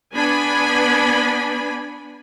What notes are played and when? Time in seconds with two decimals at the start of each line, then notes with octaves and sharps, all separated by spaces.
0.14 B3 D4 G#5 B5